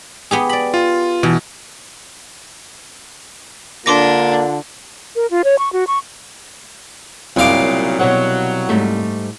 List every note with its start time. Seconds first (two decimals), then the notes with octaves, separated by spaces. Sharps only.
0.31 B3 G4 G#4
0.49 D5 B5
0.74 F4
1.23 B2 E3
3.86 D3 A#3 D4 F4 C6 D6 A#6
5.16 A#4
5.31 F4
5.44 C#5
5.59 C#6
5.73 F#4
5.87 C#6
7.36 C2 A#2 C#3 F#3 F5 G5 D6
7.99 B2 F#3 C#5 F#5
8.69 G#2 G3 A3